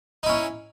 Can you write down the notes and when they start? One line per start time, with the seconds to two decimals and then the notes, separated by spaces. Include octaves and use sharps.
0.23 D#4
0.26 E4
0.29 C#4